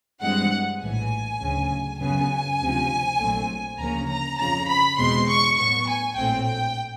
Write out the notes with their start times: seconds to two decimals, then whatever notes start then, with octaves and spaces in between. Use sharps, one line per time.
0.22 G2 E3 G#3 C4 F#5
0.82 A#1 A2 E3 G#5
1.41 D2 C#3 F#3
2.00 F#2 C#3 F#3 B3 G#5
2.60 D2 C3 F3
3.20 A#1 A#2 F#3 A3 C4
3.79 D2 C#3 F3 A#3 C#4 A#5
4.09 A#5
4.39 F2 C#3 F3 A#5
4.69 B5
4.98 E2 B2 G#3 C4 C6
5.28 C#6
5.58 A2 F#3 B3 C#6
5.87 G#5
6.17 A#1 A2 F#3 A3 C4 G5
6.46 G5